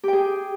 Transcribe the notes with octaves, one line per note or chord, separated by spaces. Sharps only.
G4 G#4 G5